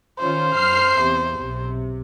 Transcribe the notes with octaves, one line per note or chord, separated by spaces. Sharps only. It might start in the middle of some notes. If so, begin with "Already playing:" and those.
D#3 C#4 F4 C5
F#2 F6 C7
E2 C3
B1 C3